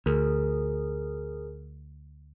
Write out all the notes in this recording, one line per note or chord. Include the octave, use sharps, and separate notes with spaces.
D2 G#4 A#4